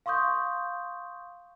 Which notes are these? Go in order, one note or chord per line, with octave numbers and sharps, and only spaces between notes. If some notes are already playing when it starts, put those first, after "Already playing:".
F5 C6 C#6 D#6 G6